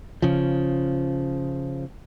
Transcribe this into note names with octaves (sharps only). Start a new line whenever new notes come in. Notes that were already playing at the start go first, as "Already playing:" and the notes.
C#3 F3